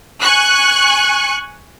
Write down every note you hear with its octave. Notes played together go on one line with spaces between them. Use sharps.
G#5 C#6 F#6